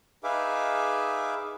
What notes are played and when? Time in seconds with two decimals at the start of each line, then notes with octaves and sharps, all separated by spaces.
0.23 D#4 G#4 B4 E5 F5 D6